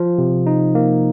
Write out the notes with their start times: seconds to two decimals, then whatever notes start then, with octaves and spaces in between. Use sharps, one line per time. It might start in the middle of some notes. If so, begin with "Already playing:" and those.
Already playing: F3
0.18 C3
0.47 D#4
0.75 A#3